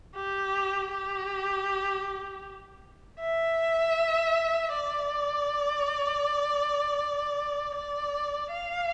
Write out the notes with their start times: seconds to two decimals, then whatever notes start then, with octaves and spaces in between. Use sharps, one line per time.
0.16 G4
0.92 G4
3.20 E5
4.73 D5
7.76 D5
8.53 F5